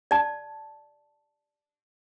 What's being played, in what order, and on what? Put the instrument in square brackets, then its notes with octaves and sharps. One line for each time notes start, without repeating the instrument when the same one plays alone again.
[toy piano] D5 A5